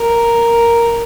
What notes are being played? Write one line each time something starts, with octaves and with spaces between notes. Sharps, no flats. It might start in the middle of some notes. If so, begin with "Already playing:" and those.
Already playing: A#4